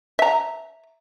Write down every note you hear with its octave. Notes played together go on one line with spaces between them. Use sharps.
E5 A#5